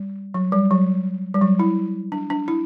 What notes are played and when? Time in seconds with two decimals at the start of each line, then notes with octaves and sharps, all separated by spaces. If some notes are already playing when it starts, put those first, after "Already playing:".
Already playing: G3
0.34 F#3
0.52 G3
0.71 F#3
1.34 G3
1.41 F#3
1.59 E4
2.12 D4
2.30 D4
2.48 E4